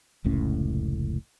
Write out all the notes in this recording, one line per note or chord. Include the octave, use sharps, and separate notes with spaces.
F1 C#2 A2 C#4